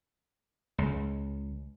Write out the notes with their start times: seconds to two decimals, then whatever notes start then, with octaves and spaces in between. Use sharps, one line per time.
0.78 C#2